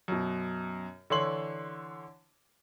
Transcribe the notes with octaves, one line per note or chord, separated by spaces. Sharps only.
F#2 B2
D3 E3 C#5 C6 F#7